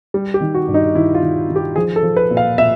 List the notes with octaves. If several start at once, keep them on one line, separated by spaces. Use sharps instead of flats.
G3
G4
D#3
F#4
G2
D#4
D#3 E4
F4
D#3
D#3
G4
F3 G#4
A4
F3
B4
A#2
F5
A#2 E5